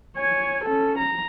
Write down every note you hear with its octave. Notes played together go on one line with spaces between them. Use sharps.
C#5 G#5
C#4 A4
A#5